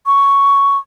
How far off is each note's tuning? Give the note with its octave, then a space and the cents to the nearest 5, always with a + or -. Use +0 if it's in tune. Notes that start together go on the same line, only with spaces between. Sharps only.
C#6 +5